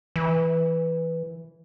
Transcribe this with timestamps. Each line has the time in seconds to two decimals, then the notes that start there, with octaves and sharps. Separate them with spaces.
0.16 E3